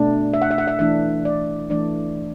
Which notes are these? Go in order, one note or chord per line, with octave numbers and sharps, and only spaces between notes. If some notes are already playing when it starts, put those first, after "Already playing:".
Already playing: B2 A3 D4
E5
F#5
E5
F#5
E5
E3 A3 D4 E5
D5
E3 A3 D4 D5